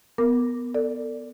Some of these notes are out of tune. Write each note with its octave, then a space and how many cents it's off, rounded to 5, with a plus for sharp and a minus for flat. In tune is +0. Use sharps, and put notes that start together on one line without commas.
B3 +0 A#4 +0 D6 +0
A4 +30 D5 +0